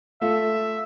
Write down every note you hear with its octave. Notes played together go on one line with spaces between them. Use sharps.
A3 F4 A4 E5